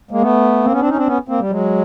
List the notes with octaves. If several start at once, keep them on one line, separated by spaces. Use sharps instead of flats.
G#3 A#3
A3 B3
A#3 C4
B3 C#4
C4 D4
C#4 D#4
C4 D4
B3 C#4
A#3 C4
G3
F#3 G#3